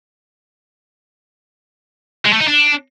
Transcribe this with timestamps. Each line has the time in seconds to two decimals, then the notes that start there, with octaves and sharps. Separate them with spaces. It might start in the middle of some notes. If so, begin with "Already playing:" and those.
2.26 G#3
2.33 A3
2.40 D#4
2.48 D4